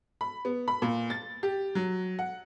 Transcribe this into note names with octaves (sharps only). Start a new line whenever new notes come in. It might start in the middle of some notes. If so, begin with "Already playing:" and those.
B5
B3
B5
A#2
A6
G4
F#3
F#5